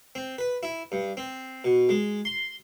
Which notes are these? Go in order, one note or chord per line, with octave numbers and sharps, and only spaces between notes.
C4
B4
E4
G2
C4
B2
G#3
C6